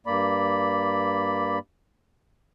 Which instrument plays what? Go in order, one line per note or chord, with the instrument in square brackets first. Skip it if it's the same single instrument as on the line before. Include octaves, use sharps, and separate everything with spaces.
[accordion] G2 A#3 D5 B5